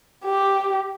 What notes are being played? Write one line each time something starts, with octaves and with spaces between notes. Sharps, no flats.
G4